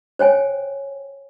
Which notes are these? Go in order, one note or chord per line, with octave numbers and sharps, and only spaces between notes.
C5 C#5 G5 G#5